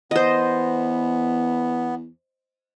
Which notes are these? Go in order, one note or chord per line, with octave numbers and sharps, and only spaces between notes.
E2 B3 C5 D#5